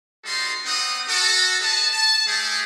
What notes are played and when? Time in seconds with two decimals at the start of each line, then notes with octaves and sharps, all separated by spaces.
0.25 G3 D#4 F#4 A4 C6
0.65 B3 C4 D#4 F#5 D#6
1.08 F#4 A4
1.60 G#4 B4 D#5 A5
1.92 A5
2.27 G3 A3 G4 G#4